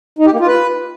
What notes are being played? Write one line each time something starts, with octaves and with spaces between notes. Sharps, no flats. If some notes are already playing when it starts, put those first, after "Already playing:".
D#4
G4
A#3
F4
B4